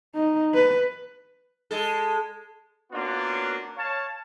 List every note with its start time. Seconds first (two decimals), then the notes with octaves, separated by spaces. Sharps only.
0.15 D#4
0.55 B4
1.71 G#3 A4
2.92 A#3 B3 C#4 D4 F4 F#4
3.77 C#5 F5 A5